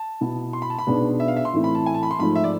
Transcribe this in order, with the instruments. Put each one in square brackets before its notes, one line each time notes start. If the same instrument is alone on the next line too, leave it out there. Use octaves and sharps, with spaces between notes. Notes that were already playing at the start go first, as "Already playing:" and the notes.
Already playing: [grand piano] A5
[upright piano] B2 B3 E4
[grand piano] C6
B5
A5
B5
[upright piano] B1 B2 B3 D4 G#4
[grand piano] E5
F5
E5
C6
[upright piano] A2 E3 A3 C4 E4
[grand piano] B5
A5
G#5
A5
B5
C6
[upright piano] G#2 F3 A3 [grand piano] B5
[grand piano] E5
D5